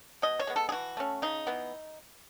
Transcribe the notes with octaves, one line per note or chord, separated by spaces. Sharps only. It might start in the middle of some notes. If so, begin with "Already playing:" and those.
B2 D#5
C#5
G#3 B3
A4
G#4
E3 F#4
A3 C#4
C#3 D#4
E3 B3